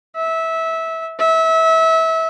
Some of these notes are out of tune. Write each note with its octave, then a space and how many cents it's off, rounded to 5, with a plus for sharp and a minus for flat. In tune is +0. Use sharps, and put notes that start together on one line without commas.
E5 -20
E5 -25